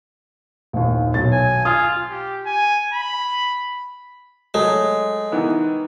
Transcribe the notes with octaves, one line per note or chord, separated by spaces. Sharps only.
A#1 D#2
B1 C#5 A6
G#5
F4 G#5 D#6
G4
G#5
B5
F#3 G#3 A3
D#3 E3 B3